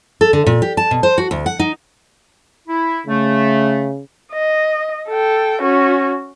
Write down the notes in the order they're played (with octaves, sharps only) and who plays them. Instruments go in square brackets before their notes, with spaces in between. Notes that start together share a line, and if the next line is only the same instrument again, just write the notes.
[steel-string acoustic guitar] A4
D3
A#2
G4
A5
B2
C5
F#4
D2
F#5
D#4
[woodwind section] E4
[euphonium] C#3 [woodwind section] A3
[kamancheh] D#5
A4 G5
C#4 F#4